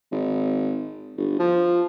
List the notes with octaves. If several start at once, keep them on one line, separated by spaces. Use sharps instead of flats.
G#1
G1
F3